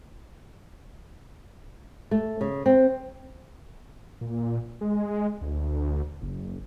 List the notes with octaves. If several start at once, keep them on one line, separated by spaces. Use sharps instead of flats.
A3
C#3
C4
A#2
G#3
D2
F#1